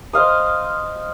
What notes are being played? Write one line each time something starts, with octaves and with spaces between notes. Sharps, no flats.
C5 D#5 F5 D#6